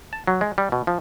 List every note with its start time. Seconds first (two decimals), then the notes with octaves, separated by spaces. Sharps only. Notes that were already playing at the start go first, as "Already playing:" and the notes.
0.13 A5
0.27 F#3
0.41 G#3
0.58 G3
0.72 B2
0.87 F3